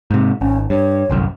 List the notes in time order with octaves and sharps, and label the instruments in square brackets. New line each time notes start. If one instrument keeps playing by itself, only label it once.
[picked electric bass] G#2 C3
[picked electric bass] G#1 [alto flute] C#4
[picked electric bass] G2 [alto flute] C#5
[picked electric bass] G1 C2 F#2